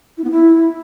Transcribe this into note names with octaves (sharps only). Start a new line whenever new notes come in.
E4
B3
E4